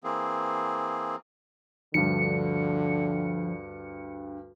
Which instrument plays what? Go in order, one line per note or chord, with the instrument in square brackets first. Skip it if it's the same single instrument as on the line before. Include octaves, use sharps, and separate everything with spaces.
[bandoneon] E3 A#3 C4 G#4
[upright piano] D2 G2 [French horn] D3 [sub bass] F3 [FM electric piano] C#7